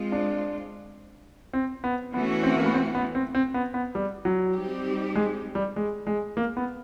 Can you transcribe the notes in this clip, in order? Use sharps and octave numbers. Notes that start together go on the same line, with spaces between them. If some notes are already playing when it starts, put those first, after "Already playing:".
Already playing: G#3 C4 F4
D4
C4
B3
E3 A3 B3 C#4 F#4
C4
A#3
B3
C4
B3
C4
C4
B3
B3
G3
F#3
G3 C4 D#4 G4
G#3
G3
G#3
G#3
A#3
B3